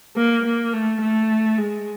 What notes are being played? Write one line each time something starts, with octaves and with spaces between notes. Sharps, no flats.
A#3
A#3
A3
A3
G#3